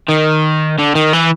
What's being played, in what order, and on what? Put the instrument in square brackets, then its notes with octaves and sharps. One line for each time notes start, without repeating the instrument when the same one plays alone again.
[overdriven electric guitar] D#3
D3
D#3
E3